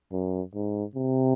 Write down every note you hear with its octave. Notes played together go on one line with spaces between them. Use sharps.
F#2
G#2
C3